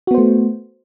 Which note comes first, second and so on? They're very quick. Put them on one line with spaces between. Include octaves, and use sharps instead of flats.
F#4 B3 C5 A3